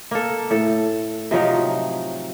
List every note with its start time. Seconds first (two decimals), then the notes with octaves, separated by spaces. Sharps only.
0.11 A#3 A4
0.51 A2 A4
1.31 C3 F3 F#3 D#4